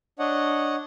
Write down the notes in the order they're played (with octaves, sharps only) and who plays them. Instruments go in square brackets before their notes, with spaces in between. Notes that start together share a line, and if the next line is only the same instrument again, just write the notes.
[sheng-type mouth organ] D4 C#5 D#5 F#5